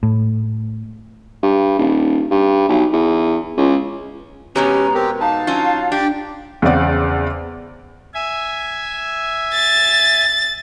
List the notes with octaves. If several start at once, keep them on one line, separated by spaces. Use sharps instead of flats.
A2
G2
D#1
G2
B1
E2
C#2
B2 G#3 B3 C#4 G4 A#5
C4 G4 A#4
D#4 F5 A5
F#3 C#4 F4
D4 G4 G5
E2 C#3 C4 D5 F#5
E5 G#5
A6